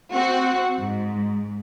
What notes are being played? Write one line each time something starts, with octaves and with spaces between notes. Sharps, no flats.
C4 F#4
G#2